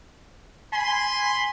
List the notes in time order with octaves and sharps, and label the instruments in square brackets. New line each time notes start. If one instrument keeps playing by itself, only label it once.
[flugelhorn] G#5 [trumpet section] B5 C6